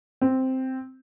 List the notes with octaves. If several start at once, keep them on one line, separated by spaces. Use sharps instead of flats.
C4